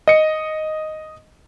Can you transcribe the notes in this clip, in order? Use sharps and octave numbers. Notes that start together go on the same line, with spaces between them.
D#5 C#7